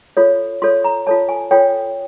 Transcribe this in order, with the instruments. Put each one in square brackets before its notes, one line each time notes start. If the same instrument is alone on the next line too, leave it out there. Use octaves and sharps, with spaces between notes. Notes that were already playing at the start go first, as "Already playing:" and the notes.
[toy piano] F4 A4 C#5
F4 A4 C#5 C6
A#5
F4 A4 C#5 A5
G#5
F4 A4 C#5 G5